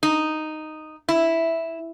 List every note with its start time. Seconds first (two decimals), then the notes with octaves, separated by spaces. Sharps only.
0.03 D#4
1.09 E4